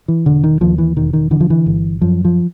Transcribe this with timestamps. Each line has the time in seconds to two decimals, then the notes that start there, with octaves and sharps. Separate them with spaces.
0.08 E3
0.26 E1 D3
0.44 D#3
0.61 D#2 F3
0.78 E3
0.97 E1 D#3
1.13 D#3
1.31 D3 E3
1.40 F3
1.50 E3
1.66 G1
2.02 F#2 F3
2.25 F3